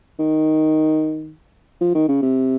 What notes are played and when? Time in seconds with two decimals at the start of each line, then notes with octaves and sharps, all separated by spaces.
0.19 D#3
1.81 F3
1.95 D#3
2.09 C#3
2.22 C3